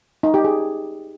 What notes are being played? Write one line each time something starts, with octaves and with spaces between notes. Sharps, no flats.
D#4
G4
G#4